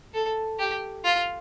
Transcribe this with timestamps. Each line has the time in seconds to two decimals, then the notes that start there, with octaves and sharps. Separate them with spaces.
0.14 A4
0.59 G4
1.04 F4